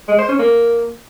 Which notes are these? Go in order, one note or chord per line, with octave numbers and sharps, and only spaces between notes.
G#3
C5
C#4
A#3